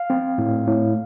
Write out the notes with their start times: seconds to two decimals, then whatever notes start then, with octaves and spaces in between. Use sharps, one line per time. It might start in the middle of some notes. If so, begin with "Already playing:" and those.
Already playing: F5
0.10 C4
0.38 A2
0.68 A2